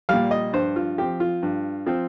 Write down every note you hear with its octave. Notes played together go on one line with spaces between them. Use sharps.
A#2 G3 F5
D#5
G2 C5
F4
F3 C4 G4
F4
G2
F3 C4